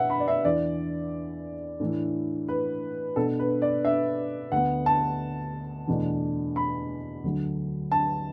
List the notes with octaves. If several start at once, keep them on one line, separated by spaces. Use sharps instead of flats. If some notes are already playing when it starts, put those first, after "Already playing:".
Already playing: B2 D4 B4 E5 F#5
B5
D5
E5
E2 E3 D4 D5
A2 E3 D4
B4
B2 B3 D4 A4
B4
D5
E5
D2 D3 B3 F#5
A5
E2 B2 A3 D4
B5
D2 D3 F#3
A5